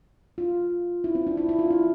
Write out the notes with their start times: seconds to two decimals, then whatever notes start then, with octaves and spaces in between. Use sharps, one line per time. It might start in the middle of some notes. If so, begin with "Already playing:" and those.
0.38 F4
1.04 E4
1.15 C4
1.27 D4
1.37 E4
1.49 E4
1.59 F4
1.70 E4